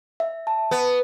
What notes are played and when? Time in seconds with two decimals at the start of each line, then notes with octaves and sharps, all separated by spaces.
0.20 E5
0.47 A5
0.71 B3